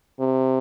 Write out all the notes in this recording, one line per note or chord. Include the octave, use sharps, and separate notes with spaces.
C3